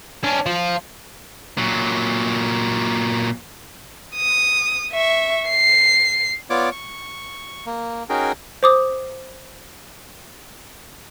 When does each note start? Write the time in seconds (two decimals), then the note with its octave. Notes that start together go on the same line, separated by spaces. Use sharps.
0.24 C#4 D4
0.46 F3 F4
1.58 A#2 F#3
4.15 D#6
4.92 E5 C#6
5.50 C7
6.50 B3 F4 C#5 D5 D6
6.72 C#6
7.66 A#3
8.09 C#4 D#4 F#4 G#4 A#4 G5
8.63 C5 D6 D#6